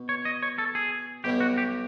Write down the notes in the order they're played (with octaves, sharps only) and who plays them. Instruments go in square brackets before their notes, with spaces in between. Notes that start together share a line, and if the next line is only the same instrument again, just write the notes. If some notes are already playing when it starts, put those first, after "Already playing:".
Already playing: [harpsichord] B2
[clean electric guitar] C#5
D#5
C#5
A4
G#4
[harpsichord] B1 B2 G3 [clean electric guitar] G4
[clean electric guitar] F#4
G4